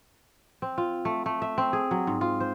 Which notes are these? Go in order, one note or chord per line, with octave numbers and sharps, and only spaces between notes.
C4
F4
A3
A3
E5
C4
G#4
F#3
G#2
F4
C5